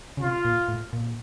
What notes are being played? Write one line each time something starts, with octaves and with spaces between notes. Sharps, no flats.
C#3
C3 F4
A#2
A2
A#2